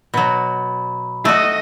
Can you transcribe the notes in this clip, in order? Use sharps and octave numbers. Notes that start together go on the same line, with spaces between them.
B2 F#3 B5
A3 F#4 D#5